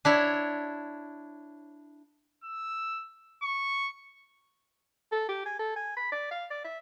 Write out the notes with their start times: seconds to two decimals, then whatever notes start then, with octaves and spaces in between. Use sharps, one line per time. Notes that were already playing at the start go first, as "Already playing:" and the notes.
0.05 D4 E4 C#5
2.44 E6
3.42 C#6
5.12 A4
5.28 G4
5.46 G#5
5.59 A4
5.76 G#5
5.97 B5
6.12 D5
6.31 F5
6.50 D5
6.64 E5